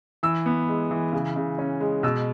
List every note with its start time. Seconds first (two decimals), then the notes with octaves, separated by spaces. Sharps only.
0.23 E3 E6
0.46 B3
0.68 G#3
0.91 E3
1.13 C#3
1.36 C#3
1.58 C#4
1.80 G#3
2.03 B2 E6